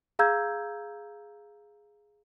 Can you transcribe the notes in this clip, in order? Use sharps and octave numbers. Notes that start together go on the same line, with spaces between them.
G#4 F5 A#5 E6 G6 G#6